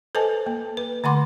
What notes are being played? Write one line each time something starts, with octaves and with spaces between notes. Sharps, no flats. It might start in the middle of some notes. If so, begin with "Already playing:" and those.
A4 B4 C5 D#5 G#5 A5
A#3
B4
D3 A3 F#5 B5 C6 D6